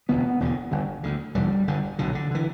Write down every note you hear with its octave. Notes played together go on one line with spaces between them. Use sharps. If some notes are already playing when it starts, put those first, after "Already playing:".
E1 D2 D3 B3
E1 E2 D3
G1 G2 D3
D2 D3
E1 E2 D3 G3
G1 G2 D3
B1 B2 D3
D3
D3 E3